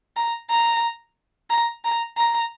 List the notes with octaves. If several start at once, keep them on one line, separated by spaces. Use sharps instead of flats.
A#5
A#5
A#5
A#5
A#5